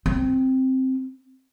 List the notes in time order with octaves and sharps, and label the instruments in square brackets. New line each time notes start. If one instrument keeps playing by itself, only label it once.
[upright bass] C4